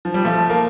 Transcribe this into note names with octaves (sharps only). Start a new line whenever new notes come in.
F3
G3
F3 A3
A#3